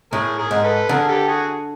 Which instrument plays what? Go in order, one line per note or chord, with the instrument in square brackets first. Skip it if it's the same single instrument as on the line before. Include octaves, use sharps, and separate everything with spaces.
[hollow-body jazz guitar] A2 [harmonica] G#4 A#4
[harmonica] G#4 A#4
[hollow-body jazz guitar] G#2
[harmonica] A4 B4
[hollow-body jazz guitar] D3 [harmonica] G#4 A#4
[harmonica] G4 A4
F#4 G#4